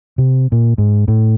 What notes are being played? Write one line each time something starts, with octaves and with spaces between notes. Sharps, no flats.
C3
A#2
G#2
A2